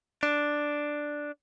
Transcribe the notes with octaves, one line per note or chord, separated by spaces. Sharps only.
D4